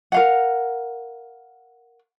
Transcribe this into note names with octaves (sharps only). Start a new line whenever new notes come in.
A#4 F5 F#5